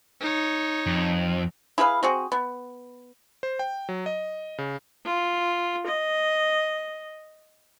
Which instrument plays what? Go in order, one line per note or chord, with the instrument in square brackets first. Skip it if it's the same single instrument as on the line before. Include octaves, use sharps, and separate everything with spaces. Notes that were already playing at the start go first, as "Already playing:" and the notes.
[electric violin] D#4 C#5
[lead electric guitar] F2
[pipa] E4 G#4 B4 F5
C4 F#4 G#4
B3
[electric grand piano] C5
G5
F#3
D#5
C#3
[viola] F4
D#5